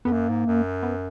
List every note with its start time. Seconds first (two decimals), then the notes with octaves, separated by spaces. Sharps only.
0.05 F2 B3
0.12 F#2 A#3
0.30 G#2
0.47 F#2
0.83 B3